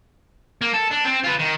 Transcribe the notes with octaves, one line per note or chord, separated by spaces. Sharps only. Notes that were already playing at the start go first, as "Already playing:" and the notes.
A#3
A4
D4
C4
F4 B4
D#3